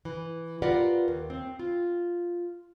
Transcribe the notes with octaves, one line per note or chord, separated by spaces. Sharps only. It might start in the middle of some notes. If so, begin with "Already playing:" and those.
E3
F4 G4 A#4 B4 D5 F#5
D#2
C4
F4